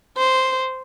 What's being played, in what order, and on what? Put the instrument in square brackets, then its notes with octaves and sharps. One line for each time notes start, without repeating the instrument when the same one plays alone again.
[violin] C5